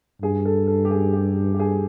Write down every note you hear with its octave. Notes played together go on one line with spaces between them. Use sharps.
G2 G#4
A4
A4
G4
G#4
G4
G4
G#4